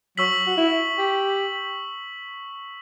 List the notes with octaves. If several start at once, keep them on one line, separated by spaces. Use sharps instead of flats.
F#3 C#6 E6 B6 F#7
F#4
E4
G4